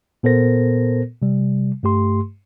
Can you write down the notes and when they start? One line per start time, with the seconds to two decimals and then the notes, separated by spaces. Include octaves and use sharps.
0.23 A#2 B3 A4 A#4 C5 A#6
1.22 C3 G3
1.83 G2 A3 G4 C6